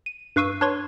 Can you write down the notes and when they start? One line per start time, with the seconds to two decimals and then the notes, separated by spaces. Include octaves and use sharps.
0.06 D#7
0.36 G2 B4 F5 C#6 E6 D#7
0.61 D4 B4 C#5 C6 C#6